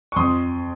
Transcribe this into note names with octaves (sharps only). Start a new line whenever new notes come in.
C#6
F2 C6 D#6